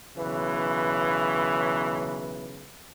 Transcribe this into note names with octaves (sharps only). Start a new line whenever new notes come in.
B1 C#3 E3 B4